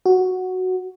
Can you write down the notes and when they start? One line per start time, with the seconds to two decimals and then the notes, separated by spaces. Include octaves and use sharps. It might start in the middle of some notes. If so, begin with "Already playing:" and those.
0.06 F#4